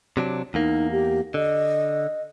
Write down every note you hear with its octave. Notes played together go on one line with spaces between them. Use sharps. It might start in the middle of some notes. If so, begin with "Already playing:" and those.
C3 F#3 D4
E2 A#3 D#4
G4
D3 D#5